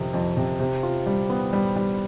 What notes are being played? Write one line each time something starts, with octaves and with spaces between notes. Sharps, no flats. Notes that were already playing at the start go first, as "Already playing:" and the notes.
Already playing: F2 C3 D#3
F2
C3
C3
F4
G3
B3
G3
G3